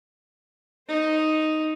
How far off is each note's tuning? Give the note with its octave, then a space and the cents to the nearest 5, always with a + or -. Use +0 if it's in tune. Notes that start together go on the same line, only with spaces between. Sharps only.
D#4 +0 C5 +15